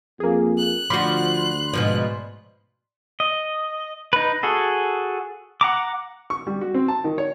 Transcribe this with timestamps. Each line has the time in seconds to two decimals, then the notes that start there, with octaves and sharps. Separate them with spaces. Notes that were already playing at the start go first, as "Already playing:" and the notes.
0.20 F2 A#3 G#4
0.58 F#6
0.90 D2 F3 F#4 D5 B5 C6
1.73 G#2 B2 F3
3.20 D#5
4.13 D#4 B4
4.43 F#4 G#4 A4
5.61 F#5 A#5 D6
6.30 C#6
6.47 G3
6.61 F#4
6.74 C4
6.88 A5
7.04 D#3
7.18 C#5